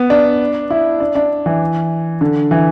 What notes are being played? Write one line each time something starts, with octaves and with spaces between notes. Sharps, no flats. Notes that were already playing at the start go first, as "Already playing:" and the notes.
Already playing: B3
D4
E4
D4
D4
E3
D3
E3